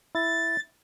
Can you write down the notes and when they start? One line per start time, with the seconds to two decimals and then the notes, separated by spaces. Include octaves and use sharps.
0.15 E4 A6